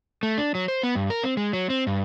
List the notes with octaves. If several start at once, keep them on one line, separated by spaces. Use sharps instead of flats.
A3
D4
F#3
C5
B3
G2
A#4
C4
G#3
F#3
C4
G2